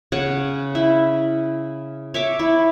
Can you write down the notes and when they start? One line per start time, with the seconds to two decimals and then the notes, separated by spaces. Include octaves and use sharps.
0.12 C#3 C#5 F#5
0.75 E4
2.14 C#5 E5 D6
2.39 E4